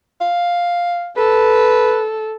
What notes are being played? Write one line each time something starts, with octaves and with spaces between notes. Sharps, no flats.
F5
A4 B4